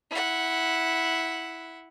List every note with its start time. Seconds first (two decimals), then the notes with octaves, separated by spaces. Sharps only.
0.11 E4 F#5